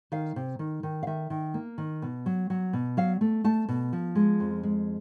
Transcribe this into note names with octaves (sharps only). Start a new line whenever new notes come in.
D#3 F5
C3
D#3
D#3
F5
D#3 E5
D#3
A#3
D#3
B2
F#3
F#3
B2
F#3 F5
A3
A3 A5
B2
F3
G#3
F2
G#3